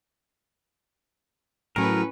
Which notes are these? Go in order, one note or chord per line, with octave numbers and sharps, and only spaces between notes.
A2 F#3 C#4 A#4 B4